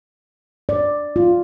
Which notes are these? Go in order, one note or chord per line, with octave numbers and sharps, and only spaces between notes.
D5
F4